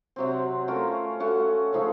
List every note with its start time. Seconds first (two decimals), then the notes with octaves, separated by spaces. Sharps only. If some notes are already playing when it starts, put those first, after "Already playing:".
0.16 C3 F#3 C4
0.68 A3 C#4 F4 A#4
1.20 A3 C#4 F#4
1.73 C#3 F3 A3 D#4